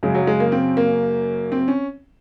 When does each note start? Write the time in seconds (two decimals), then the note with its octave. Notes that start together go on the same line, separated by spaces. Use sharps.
0.03 F#2 C#3 G#3
0.15 F#3
0.27 G#3
0.40 A#3
0.52 C4
0.77 A#3
1.52 C4
1.68 C#4